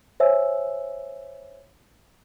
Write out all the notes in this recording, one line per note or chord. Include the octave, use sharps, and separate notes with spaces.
C5 C#5 E5 G#5 E6